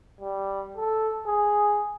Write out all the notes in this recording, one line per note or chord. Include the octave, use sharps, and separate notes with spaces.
G3
A4
G#4